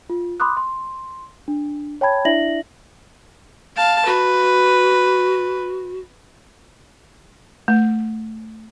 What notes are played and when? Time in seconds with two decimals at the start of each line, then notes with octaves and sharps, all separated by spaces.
0.10 F4
0.40 B5 C6 D6 D#6 F#6
0.57 C6
1.48 D4
2.01 C#5 G5 A5 B5 G#6
2.25 D4 E4 D5 E5 A#6 F#7
3.77 F5 A5
4.06 F#4 B4
7.68 A3